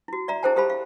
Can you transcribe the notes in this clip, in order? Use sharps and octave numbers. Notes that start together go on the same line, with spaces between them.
E4 F#4
D5 E5 A#5
E4 G#4 A4 C5 G5 A5
G4 A4 C5 F5 A5 B5
F5